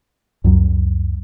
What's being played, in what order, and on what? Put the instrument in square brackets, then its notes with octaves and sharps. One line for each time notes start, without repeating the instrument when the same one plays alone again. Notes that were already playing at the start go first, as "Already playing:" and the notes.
[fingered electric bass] C#2 F#2 F#3